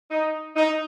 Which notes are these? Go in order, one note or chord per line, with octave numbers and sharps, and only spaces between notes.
D#4
D#4